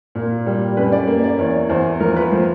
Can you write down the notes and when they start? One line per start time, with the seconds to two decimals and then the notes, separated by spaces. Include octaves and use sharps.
0.15 A#2
0.46 G3
0.77 F#2 B4
0.92 D5
1.07 A#3
1.24 D5
1.39 E2 C#5
1.69 E2 C5
2.00 F3 A#4
2.16 B4
2.31 F3 C5